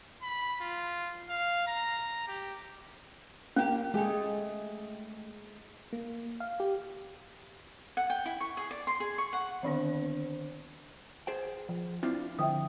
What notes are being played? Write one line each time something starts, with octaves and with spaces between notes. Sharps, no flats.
B5
F4
F5
A#5
G4
A#3 C#4 G4
G#3 A3 G4 G#4
A#3
F5
G4
F#5
G5
E4
C#6
G#4
D5
C6
G#4
C#6
F#5
D3 D#3 D4 C5
G#4 C5 G5
F3
C4 D4 E4 F4
D3 F3 E5 G5 D#6